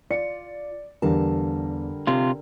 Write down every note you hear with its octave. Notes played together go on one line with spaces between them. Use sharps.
F4 D5 C#7
E2 D3 G3 A#4 F5 A5
C3 F4